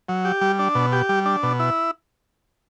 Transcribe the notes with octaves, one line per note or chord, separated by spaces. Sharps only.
F#3
G4
G3
D4
B2
G4
G3
D4
B2
E4